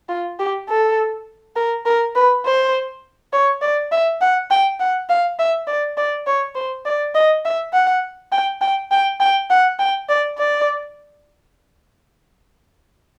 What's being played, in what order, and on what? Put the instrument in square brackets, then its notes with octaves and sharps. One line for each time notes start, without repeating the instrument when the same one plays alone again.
[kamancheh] F4
G4
A4
A#4
A#4
B4
C5
C#5
D5
E5
F#5
G5
F#5
F5
E5
D5
D5
C#5
C5
D5
D#5
E5
F#5
G5
G5
G5
G5
F#5
G5
D5
D5